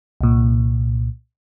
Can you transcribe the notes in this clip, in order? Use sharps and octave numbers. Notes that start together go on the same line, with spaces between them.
C2 A#2